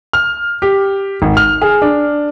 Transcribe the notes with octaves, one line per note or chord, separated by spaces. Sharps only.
F6
G4
G#1
F6
G#4
D4